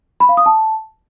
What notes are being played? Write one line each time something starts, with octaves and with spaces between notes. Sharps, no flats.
B5
F5
D#6
A5